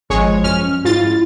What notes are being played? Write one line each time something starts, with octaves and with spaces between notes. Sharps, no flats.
G#1 F3 G#3 C#5
F#2 C#4 F6
G#2 E4 F4 A6